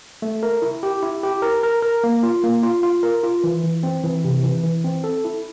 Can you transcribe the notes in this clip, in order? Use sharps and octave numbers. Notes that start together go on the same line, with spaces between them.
A3
A#4
E4
G4
E4
G4
A#4
A#4
A#4
A#3
F4
A#3
F4
F4
A#4
F4
E3
E3
C4
E3
C3
E3
E3
C4
A4
E4